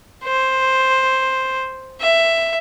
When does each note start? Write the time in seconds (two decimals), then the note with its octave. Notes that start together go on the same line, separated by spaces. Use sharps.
0.24 C5
2.01 E5